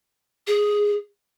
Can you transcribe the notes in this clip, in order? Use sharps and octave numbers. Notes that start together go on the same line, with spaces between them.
G#4